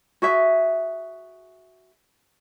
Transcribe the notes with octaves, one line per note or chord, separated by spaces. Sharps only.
F#4 G#4 E5